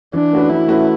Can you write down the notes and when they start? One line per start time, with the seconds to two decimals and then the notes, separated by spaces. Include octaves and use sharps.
0.13 E3 D4
0.33 A3 C#4 F#4 B4
0.50 E3 E4
0.68 A3 C#4 F#4 B4